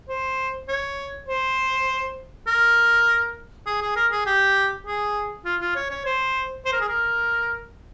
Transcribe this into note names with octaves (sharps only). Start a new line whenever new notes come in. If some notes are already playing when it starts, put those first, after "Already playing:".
C5
C#5
C5
A#4
G#4
G#4
A#4
G#4
G4
G#4
F4
F4
C#5
C#5
C5
C5
A#4
G#4
A#4